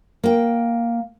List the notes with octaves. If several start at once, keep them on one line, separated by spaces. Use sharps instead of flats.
A#3 G5